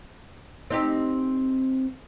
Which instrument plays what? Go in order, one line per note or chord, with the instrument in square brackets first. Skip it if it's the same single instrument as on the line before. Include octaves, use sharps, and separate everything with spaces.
[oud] C4 D#4 G4